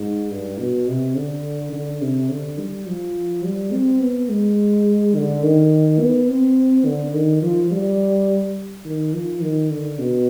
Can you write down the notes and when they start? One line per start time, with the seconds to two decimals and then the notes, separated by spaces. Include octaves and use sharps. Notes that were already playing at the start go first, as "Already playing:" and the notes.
Already playing: G#2
0.31 G2
0.59 B2
0.88 C3
1.16 D3
1.73 D3
2.01 C3
2.30 D3
2.58 G3
2.87 F3
3.44 G3
3.72 C4
4.01 B3
4.29 G#3
5.15 D3
5.43 D#3
6.00 B3
6.28 C4
6.85 D3
7.14 D#3
7.42 F3
7.71 G3
8.85 D#3
9.13 F3
9.42 D#3
9.70 D3
9.99 B2